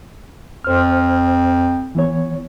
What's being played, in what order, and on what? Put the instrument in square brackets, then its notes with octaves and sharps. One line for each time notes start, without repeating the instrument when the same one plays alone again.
[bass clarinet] F2 [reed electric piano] C5 F6
[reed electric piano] E3 B3 C#5